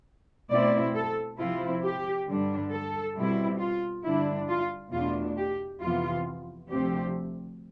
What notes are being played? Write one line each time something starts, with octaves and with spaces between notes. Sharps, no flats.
B2 A3 C4 E4 D5
A4
C3 F3 C4 E4 F4
G4
G2 D3 G3 D4
A4
B2 G3 C4 E4
F4
G2 D3 G3 D4 E4
F4
E2 B2 A3 D4 F4
G4
F2 C3 E3 B3 F4
D2 C3 F3 C4 G4